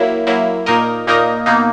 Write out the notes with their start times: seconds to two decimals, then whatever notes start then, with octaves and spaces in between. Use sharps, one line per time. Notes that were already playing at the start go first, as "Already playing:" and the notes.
Already playing: F#3 A#3 E4
0.27 F#3 A#3 E4
0.66 A#2 A#3 D#4 A#4 D#5
1.07 A#2 A#3 D#4 A#4 D#5
1.46 B2 A#3 D#4